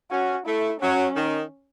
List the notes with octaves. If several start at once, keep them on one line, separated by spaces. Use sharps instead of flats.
C#4 F#4
A3 E4
F#3 C#4
D#3